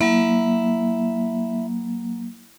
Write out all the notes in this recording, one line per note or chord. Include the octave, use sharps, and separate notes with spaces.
F#3 A#3 E4